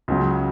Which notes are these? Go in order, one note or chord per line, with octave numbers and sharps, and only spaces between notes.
C#2 C#3 F#3